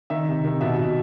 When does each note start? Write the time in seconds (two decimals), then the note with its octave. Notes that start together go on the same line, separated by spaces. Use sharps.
0.10 D#3 E5
0.28 C3
0.44 D#3
0.61 B2 E5
0.78 B2